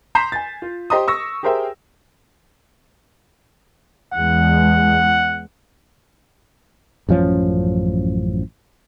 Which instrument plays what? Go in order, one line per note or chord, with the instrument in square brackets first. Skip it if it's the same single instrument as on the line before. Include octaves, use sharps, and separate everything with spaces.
[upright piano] A#5 C6 G6 B6 C7 E7
G#5 A6
F4
G4 C5 D#5 A#5 C6 D#6
C#6 E6 A#6
G4 G#4 A#4 C5 E5 G5
[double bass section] E2 G#3 [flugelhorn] F#5
[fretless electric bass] A1 F#2 F3 C#4